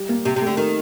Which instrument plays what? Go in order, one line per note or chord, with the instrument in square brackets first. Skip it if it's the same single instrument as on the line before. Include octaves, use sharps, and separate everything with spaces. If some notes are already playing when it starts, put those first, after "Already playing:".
Already playing: [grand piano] G3 G4
A#3
[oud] C3 [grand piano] G4
[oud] C3
[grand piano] A3
[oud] D3
D#3